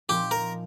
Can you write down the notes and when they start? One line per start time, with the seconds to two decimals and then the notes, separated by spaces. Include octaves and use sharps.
0.09 A#2 F3 C4 D#4 G4
0.31 A#4